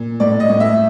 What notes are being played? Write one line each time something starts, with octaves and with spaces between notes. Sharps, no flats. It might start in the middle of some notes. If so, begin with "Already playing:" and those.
Already playing: A#2
A2 D5
D#5
A2
E5